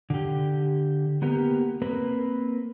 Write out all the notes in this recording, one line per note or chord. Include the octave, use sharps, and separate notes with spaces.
D3 G4
A#3 B3 G4 A#4
A#3 C4 A#4 B4